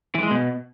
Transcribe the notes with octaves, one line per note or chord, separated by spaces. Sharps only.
E3
G#3
B2